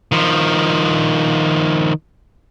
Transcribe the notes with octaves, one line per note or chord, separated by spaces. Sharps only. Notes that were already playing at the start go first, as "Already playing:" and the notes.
D#3 F3